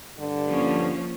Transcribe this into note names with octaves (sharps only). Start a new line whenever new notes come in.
G2 D3
F3 A#3 C#4